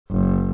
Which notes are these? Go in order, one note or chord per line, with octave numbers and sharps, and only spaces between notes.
F#1